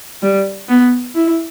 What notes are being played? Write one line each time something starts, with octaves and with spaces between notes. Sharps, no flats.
G3
B3
E4